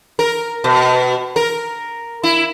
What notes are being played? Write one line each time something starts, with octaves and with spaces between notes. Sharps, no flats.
A#4
B2
A#4
E4